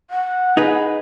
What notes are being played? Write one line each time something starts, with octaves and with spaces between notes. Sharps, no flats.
F#5
D#4 G#4 B4